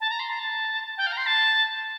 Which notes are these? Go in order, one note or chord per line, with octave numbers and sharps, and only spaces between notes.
A5
A#5
C6
A#5
A5
G5
F5
A#5
C6
A5